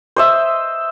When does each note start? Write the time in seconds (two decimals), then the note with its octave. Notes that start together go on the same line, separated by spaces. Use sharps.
0.16 C5 D#5 E5